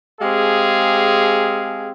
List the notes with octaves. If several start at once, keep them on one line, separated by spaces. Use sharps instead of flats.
G#3 C4 G4 G#4 F5